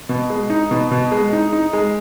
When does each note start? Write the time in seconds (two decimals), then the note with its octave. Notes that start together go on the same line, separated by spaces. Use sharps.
0.09 B2
0.30 G#3
0.50 D#4
0.71 B2
0.91 B2
1.12 G#3
1.33 D#4
1.53 D#4
1.73 G#3